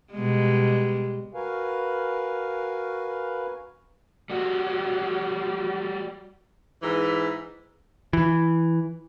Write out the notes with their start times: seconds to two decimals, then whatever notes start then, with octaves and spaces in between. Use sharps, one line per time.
0.12 B2 G3 G#3
1.34 F#4 A#4 B4 F5 G#5
4.30 G3 F#4
6.82 G#2 E3
8.13 E3